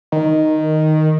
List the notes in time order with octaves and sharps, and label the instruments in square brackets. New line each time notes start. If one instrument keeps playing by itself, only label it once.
[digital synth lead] D#3